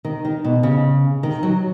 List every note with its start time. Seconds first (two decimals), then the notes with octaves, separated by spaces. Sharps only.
0.05 D#3
0.25 D#3
0.45 B2
0.63 C#3
1.23 D#3
1.43 F#3